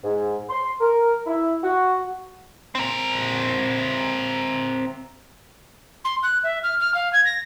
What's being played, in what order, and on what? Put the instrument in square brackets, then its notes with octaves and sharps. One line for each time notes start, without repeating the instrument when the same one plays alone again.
[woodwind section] G#2
C6
A#4
E4
F#4
[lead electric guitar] C4 A#4
[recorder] C6
F#6
E5
F6
F6
F5
G#6
A#6